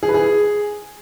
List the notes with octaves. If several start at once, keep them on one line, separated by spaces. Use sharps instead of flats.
G#4
B4
G#4